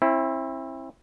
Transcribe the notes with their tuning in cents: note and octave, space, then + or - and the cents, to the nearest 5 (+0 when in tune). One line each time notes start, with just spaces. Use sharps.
C4 +35 E4 +0